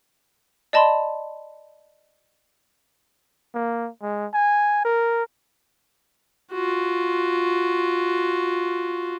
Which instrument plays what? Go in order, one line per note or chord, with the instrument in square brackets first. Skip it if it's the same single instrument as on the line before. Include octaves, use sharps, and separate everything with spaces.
[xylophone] D5 D#5 A5 B5 C6
[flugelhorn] A#3
G#3
G#5
A#4
[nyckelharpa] F4 F#4